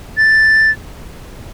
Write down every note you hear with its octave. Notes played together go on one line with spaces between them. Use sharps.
A6